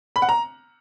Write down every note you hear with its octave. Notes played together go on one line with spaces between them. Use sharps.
B5
F#5
A#5